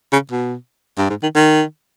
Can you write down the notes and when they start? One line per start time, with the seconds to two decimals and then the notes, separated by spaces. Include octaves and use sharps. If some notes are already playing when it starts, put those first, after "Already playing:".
0.12 C#3
0.31 B2
0.97 G2
1.09 G#2
1.23 D#3
1.35 D#3